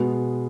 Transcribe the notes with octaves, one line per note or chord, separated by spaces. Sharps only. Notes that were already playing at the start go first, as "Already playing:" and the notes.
Already playing: B2 G#3 B3